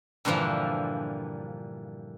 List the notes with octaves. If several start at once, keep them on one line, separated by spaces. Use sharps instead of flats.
G2 A#2 D3 E3 F3